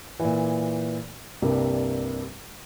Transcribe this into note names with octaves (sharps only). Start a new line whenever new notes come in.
A#2 E3
C2 G2 C3 G3 A#3